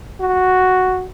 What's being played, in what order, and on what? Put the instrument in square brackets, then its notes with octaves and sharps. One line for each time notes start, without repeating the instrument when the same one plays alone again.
[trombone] F#4